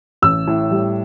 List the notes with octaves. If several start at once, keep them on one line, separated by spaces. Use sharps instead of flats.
A1 E6
A2
G3